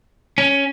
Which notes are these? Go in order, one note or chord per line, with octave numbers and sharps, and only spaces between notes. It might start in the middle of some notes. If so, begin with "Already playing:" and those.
C#4